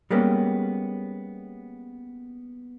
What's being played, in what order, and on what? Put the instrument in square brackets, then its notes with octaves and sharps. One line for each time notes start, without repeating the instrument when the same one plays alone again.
[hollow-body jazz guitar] G3 G#3 A#3 B3 C#4 G4